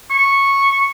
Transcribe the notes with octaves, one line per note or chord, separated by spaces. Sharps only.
C#6